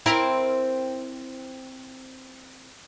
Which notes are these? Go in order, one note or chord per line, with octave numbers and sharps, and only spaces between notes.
C4 E4 A#4